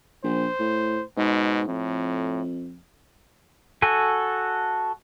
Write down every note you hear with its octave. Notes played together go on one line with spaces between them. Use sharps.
A#1 C5
A2
G#2 B2
F2 A2
F#4 A4 G#5